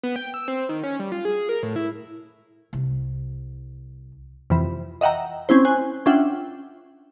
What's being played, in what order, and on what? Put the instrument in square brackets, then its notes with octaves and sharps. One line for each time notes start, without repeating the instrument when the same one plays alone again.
[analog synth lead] B3
G5
E6
C4
D#3
C#4
G3
F4
G#4
A#4
A2
E4
[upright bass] C2
[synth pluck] F2 C3 E3
D#5 E5 F#5 G5 A#5
C4 C#4 E4 C5
C5 G#5 F#6
C#4 D4 F4 E5 F#5 G5